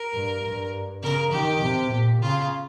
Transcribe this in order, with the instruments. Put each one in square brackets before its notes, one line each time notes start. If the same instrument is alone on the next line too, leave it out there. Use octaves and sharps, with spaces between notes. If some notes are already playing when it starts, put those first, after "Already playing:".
Already playing: [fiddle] A#4
[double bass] G2
G2
[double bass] C#3 [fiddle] A#4
[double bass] D#3 [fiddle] G4
[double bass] C3
A#2
[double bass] C#3 [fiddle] F4